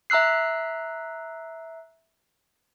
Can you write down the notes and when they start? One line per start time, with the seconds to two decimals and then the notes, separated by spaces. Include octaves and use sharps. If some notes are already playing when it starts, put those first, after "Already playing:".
0.10 E5 A#5 E6 F#6 C7